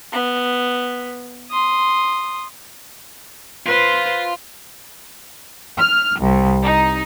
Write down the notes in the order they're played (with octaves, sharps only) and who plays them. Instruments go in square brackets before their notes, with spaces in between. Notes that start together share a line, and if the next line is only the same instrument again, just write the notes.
[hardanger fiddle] B3
C6 D#6
[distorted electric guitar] F4 [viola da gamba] B4 C5
[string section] F6
C2
D#4